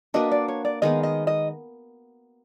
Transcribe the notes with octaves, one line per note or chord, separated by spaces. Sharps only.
A#3 D4 F#4 B4 D#5
D5
C#5
D5
D#3 G#3 B3 D#4 D#5
D#5
D#5